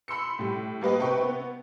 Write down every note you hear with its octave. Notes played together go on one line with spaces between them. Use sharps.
B5 C6 E6 C#7
A2 G3
G3 A#3 B4 D#5
C3 B4 G5 C#6
B3